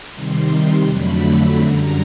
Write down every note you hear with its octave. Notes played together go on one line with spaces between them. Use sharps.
C3 D#3 G3 C6
C6
F2 D3 F#3 A3 B5
F#2 D3 G3 A#5